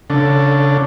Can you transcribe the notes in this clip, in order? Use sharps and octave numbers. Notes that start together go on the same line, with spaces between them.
C#3 D4 A4